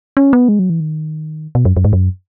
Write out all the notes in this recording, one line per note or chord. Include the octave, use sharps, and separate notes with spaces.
C#4
B3
G#3
F#3
E3
D#3
B2
F#2
F#2
G#2
F#2